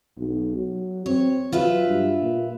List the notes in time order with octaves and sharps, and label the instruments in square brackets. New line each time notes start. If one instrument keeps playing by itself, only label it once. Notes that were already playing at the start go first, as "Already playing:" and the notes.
[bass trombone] B1
F#3
[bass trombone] C4 [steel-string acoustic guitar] C#5
[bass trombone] F#3 [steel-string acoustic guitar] F4 B4 E5
[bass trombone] G2
A#2